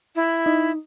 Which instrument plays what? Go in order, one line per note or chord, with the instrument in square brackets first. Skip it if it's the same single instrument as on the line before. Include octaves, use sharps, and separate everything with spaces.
[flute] E4
[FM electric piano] D#4